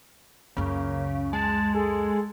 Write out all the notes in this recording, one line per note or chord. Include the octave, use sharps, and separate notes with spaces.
C#2 F#2 C#3 A#3
G#3 A5
G#4 A4